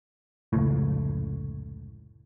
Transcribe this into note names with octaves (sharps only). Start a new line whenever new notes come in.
F1 C#2 A2